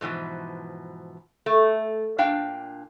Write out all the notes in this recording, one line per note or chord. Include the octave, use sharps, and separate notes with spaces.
G#2 B2 E3 F3
A3
A#2 D4 F5 G5